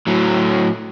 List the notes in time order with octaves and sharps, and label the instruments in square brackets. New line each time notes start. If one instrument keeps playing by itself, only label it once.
[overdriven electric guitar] A2 F#3